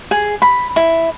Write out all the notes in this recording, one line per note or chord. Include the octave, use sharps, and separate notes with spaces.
G#4
B5
E4